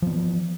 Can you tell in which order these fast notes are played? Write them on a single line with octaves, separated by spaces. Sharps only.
F3 B3 E3